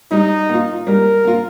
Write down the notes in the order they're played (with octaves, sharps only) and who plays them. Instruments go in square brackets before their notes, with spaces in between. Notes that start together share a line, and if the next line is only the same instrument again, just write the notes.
[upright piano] G3 [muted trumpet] D#4
[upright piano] A#3 F4
[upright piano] G3 [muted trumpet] A#4
[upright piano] A#3 F4